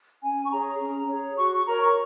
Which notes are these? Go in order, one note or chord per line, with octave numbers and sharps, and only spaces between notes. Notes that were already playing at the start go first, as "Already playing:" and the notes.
C#4 G#5
C#6
G#4 C#5 A#5
C#4
G#4 C#5
F#4 C#6
C#6
A#4 C#5 A#5
C#6